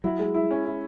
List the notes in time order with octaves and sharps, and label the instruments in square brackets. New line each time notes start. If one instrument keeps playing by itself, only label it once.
[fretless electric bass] F#3 [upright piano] E4
[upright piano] G#3
E4
C#4
E4